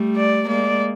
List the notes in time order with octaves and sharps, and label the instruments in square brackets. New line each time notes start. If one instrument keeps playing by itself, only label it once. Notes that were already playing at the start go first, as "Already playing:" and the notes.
Already playing: [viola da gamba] G3 A3
[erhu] D5
[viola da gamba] G#3 A#3 [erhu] D5